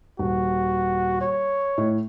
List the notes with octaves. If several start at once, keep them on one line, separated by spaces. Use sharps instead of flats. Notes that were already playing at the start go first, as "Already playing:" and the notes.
D#1 F#4
C#5
A2